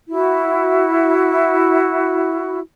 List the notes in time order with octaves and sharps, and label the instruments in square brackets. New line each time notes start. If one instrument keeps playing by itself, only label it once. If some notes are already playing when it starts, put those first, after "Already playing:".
[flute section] E4 F#4